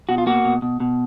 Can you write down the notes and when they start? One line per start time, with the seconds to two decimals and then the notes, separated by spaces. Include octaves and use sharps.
0.09 B2 F#4
0.18 F4
0.26 A#3 F#4
0.45 B2
0.62 B2
0.80 B2